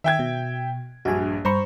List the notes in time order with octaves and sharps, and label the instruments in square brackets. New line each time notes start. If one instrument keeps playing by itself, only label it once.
[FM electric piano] D#3 [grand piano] E5 G5 G#6
[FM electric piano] B2
[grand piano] A#1 G2 [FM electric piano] F#4 G#5
[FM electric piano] G2 A#5 C#6 [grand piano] C5 B5